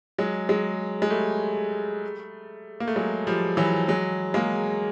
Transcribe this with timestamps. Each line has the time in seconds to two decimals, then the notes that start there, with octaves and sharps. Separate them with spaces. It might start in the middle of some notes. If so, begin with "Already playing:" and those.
0.18 F#3 G#3
0.49 F#3 G#3
1.02 G#3
1.10 G3 A3
2.80 A#3
2.88 A3
2.96 F#3 G#3
3.27 F3 G3
3.57 E3 F#3
3.88 F#3 G#3
4.34 G#3 A#3